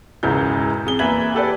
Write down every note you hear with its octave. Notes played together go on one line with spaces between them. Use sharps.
E1 C#2 G#2 C#3 E4 G6
F2 G#4 G7
E2 A#3 B4 E5 G#6 F#7
G4 A4 B4 D5